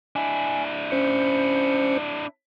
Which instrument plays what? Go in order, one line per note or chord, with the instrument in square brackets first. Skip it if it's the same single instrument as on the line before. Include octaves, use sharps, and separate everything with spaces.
[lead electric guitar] D4 E4 [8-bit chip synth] G#5
[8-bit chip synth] C#4 C5 C#7